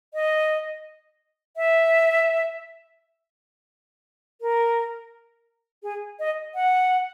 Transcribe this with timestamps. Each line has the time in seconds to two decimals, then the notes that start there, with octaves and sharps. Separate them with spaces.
0.14 D#5
1.57 E5
4.41 A#4
5.83 G#4
6.19 D#5
6.55 F#5